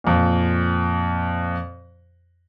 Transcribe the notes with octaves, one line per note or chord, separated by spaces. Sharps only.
F2 A#2